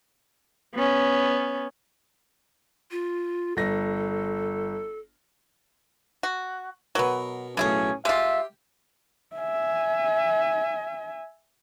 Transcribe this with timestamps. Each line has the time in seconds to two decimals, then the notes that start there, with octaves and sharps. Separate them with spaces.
0.75 B3 C#4
2.91 F4
3.57 G1 A4 A#6
6.23 F#4
6.95 B2 F#3 B3 A#4
7.57 B1 A2 C#3 C#4 E4 G#4
8.05 G#3 F4 G4 E5
9.36 E5 G#5